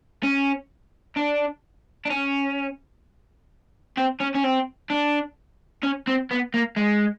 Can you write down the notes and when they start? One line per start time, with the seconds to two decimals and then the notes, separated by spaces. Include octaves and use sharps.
0.23 C#4
1.17 D4
2.05 D4
2.10 C#4
3.97 C4
4.20 C#4
4.34 C#4
4.43 C4
4.90 D4
5.83 C#4
6.07 C4
6.31 B3
6.54 A#3
6.77 G#3